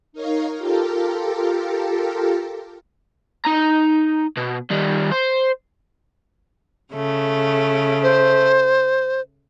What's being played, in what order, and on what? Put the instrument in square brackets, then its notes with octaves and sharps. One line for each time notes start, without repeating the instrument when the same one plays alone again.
[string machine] D#4 A#4 C#5 F5
F4 G4 A4 A#4
[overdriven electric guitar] D#4 A#5
B2
D#3 G3
C5
[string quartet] C#3 A3
[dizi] C5